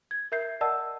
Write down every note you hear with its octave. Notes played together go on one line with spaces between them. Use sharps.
G#6
A#4 E5 G6 C7
A#4 D5 D#5 F#5 A5 E6